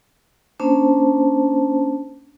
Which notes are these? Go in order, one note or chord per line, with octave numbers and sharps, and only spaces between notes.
A#3 C#4 D4 C5 A5